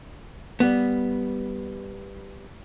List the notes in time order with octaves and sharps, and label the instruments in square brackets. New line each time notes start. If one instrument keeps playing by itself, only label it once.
[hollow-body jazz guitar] G3 B3